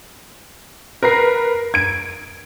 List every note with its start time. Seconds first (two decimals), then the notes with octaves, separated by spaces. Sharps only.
1.03 A#4 B4 A#6 C7
1.74 G#6 D7